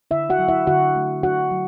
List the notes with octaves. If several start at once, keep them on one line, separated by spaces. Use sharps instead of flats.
D3 E4 E5
F#4 F#5
F#3
E4 E5
D3 F#4 F#5
A3
D4 F#4 F#5
F#3